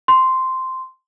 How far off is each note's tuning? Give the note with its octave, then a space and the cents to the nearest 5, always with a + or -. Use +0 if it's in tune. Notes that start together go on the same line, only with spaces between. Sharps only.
C6 -5